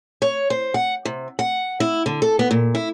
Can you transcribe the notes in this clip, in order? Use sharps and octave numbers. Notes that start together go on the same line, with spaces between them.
C#5
C5
F#5
C3
F#5
E4
D3
A4
B3
A#2
E4